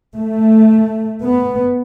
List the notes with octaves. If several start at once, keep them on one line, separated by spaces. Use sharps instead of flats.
A3
B3